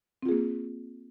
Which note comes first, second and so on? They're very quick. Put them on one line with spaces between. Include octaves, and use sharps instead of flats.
C4 F4 G#4 A#3